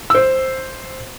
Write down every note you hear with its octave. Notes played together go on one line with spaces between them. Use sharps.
C5 E6